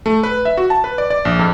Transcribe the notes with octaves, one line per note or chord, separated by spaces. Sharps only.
A3
B4
E5
F#4
A5
B4
D5
D5
A#1
F2